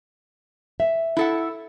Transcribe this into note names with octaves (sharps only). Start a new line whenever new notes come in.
E5
E4 A4 F#5